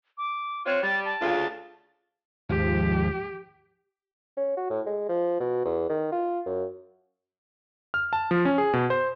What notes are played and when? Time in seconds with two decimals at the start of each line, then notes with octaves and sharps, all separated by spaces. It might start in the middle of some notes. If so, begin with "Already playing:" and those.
0.18 D6
0.66 C4 F4 C#5 F#6
0.83 G3 A6
1.05 A5
1.21 D2 C#3 F4
2.49 D#2 G#2 F3 G4
4.37 C#4
4.57 F#4
4.70 A2
4.86 G#3
5.09 F3
5.40 B2
5.65 E2
5.90 D#3
6.12 F4
6.46 F#2
7.94 F6
8.13 A5
8.31 F3
8.45 C#4
8.58 G#4
8.73 B2
8.90 C5